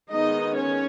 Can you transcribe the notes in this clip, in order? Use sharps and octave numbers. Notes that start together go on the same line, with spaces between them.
D#3 G#3 B3 D#4 D#5
C#4 C#5